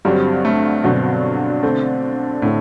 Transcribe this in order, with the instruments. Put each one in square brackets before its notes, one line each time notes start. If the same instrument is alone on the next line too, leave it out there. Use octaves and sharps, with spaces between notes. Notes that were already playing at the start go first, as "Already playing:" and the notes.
[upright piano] G2 D3 F#3 C4 [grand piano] G3
[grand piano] A3
[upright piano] G2 D3 F#3 C4 [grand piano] B2
[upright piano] D3 A3 C4
[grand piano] A2 [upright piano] D3 A3